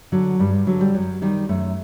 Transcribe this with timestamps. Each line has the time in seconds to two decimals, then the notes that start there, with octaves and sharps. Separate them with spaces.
0.12 D3 F#3
0.39 G2 G3
0.53 G3
0.67 D3 F#3
0.81 G3
0.94 F#2 F#3
1.22 D#3 G3
1.49 F#2 A3